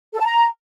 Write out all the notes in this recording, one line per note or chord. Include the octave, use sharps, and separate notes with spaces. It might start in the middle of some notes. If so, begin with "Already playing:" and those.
A4
A5
A#5